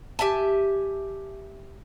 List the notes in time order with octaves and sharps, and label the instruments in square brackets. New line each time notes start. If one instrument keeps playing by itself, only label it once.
[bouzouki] G4 E5 G#5 A5